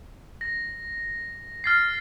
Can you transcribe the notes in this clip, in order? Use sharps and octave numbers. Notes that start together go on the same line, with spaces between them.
A#6
F6 A6 C7